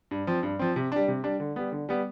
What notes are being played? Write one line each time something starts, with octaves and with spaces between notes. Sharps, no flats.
G2
F3 C4
G2
F3 C4
C3
G3 D4
C3
G3 D4
D3
G3 B3
D3
G3 B3